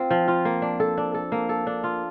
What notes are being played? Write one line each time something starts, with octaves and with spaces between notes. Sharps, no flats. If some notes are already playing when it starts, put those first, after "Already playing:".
Already playing: C4 F4
F3
F4
A#3
D4
A4
D4
A4
A#3
A4
D4
F4